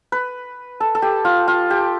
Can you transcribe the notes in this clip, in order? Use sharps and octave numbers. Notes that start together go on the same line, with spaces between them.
B4
A4
A4
G4
F4
F4
G4